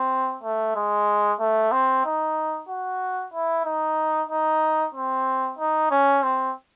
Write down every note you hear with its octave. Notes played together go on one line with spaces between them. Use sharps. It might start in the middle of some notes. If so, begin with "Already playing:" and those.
Already playing: C4
A3
G#3
A3
C4
D#4
F#4
E4
D#4
D#4
C4
D#4
C#4
C4